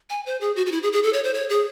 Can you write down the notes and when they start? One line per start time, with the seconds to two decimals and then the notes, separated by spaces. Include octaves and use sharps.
0.10 G#5
0.26 C5
0.41 G#4
0.56 F#4
0.66 F#4
0.72 E4
0.83 G#4
0.93 G#4
1.03 A4
1.13 C#5
1.24 C5
1.34 C#5
1.49 G#4